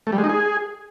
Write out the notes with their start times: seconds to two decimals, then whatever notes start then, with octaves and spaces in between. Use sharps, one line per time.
0.07 A3
0.12 G3
0.18 G#3
0.24 D#4
0.29 G#4